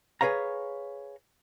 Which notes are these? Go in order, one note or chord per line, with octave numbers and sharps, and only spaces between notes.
G#4 B4 C#5 F5 A#5